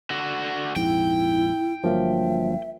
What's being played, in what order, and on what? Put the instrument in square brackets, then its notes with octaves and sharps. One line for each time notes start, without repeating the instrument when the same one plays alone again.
[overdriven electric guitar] D3 F#4
[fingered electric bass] A#1 F2 G#2 [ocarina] E4 [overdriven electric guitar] G5
[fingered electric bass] G1 G2 [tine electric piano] F3 F#3 A#3 [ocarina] E5